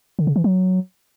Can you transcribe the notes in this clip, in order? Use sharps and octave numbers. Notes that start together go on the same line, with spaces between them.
D3
C#3
E3
F#3